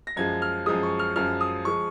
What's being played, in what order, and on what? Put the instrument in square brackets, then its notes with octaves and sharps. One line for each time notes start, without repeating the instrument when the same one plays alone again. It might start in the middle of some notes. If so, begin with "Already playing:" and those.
[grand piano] A#6
[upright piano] F#2 F3 G#3 [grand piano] G#6
[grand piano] F6
[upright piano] F#2 F3 G#3 [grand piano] D#6
[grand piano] C#6
F6
[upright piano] F#2 F3 G#3 [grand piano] F6
[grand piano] D#6
[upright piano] F3 G#3 [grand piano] C#6